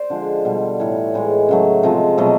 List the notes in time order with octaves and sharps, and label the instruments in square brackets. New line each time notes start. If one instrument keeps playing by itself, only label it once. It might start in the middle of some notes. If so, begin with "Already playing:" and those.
Already playing: [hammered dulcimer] C5 D5
D3 F3 G#3
B2 G3
A2 E3 G3 C#5
A2 E3 G#3
C#3 F#3 A3
C3 F3 G#3 D#5
B2 F#3 A3 D#5